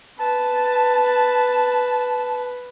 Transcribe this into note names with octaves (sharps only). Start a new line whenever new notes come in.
B4 A5